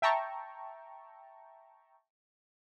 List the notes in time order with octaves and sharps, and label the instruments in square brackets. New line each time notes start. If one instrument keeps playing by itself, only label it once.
[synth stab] E5 G5 A5 A#5 C#6